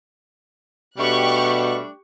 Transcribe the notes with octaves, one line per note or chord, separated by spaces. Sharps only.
B2 G3 A3 D4 G4 C#6 F#6